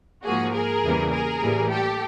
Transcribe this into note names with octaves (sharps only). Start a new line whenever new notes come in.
G#2 F3 A#3 F#4 G#4
G#4 A#4
E2 C#3 E3 G3 A#3
G#4 A#4
A2 E3 G3 A#3
G4 A4